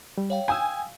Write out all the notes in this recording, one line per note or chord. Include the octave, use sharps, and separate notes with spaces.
G3
C#5 F5 G5
F5 G5 G#5 D#6 E6